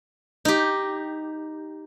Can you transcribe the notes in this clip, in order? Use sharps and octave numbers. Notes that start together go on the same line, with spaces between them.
D#4 G4